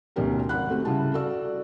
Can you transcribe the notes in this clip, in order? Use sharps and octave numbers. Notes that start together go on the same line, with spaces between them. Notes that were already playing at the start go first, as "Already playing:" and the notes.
D2 B2 D#3 C#4 G4 A#4
G#1 F#5 B5 F#6
A3 C4 F#4 G4
C#3 G3 E4 A5
F#4 A4 D5 E6